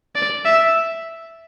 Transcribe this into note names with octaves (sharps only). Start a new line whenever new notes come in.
D5
E5